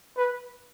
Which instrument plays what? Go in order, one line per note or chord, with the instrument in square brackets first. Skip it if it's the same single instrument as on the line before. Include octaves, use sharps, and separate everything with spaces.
[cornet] B4